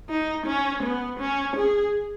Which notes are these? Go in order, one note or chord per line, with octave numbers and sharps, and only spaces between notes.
D#4
C#4
B3
C#4
G#4